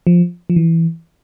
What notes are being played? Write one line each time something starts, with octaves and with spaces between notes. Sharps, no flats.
F3
F3
E3